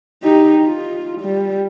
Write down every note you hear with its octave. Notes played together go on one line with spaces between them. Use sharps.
D#4 G4
F4
G3